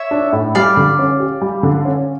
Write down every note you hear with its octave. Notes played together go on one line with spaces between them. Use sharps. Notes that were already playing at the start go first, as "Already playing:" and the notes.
Already playing: C#5 E5
D4
A2
G3 D5 F5
D3
C#4
G4
G3
D3
C#4